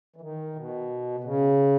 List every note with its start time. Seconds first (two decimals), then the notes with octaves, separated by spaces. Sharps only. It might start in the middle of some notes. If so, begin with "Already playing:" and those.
0.16 E3
0.21 D#3
0.56 B2
1.20 B2
1.24 C#3